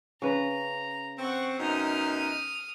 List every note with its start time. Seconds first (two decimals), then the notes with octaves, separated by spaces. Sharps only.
0.22 C#3 B4 A#5
1.19 C4 F#5 C#6
1.60 F#2 B2 D#4 D#6 F6